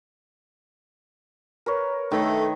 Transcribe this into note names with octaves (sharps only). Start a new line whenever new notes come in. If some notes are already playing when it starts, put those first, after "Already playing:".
A#4 B4 C#5
D#3 A3 B4 C#5